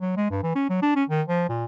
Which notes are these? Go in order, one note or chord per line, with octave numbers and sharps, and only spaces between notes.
F#3
G#3
G2
E3
C#4
F#3
D4
C#4
D#3
F3
A#2